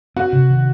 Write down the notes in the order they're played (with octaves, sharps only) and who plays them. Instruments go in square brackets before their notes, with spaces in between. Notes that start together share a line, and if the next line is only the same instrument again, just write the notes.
[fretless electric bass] C4 [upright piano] F#4 F#5
[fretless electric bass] C3
D#3